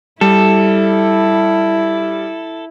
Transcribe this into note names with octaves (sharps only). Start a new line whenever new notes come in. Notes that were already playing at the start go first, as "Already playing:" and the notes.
G3 E4 A4